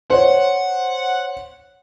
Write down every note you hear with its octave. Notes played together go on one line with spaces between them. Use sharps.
C5 C#5 F#5